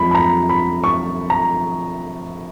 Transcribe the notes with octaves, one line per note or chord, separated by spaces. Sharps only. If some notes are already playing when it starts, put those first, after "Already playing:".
Already playing: F2 F3 G#3 B5
B5
A#5
B5
C#6
A#5